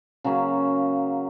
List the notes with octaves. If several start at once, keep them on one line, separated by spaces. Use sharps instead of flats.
C#3 F#3 A#3 C#4